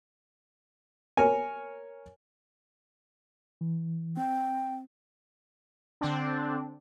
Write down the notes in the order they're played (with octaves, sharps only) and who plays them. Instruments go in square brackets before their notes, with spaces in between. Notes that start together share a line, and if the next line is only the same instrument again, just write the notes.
[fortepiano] A#4 C#5 G#5
[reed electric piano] E3
[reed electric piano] C4 [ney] G5
[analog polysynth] D3 C4 D4